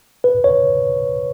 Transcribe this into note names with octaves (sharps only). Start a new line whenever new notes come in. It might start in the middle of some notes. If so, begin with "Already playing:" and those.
B4
C#5